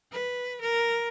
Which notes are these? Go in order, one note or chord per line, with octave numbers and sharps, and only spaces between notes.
B4
A#4